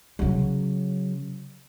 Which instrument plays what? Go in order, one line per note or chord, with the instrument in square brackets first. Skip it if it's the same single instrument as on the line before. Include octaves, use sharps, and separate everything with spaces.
[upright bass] C#3 F#3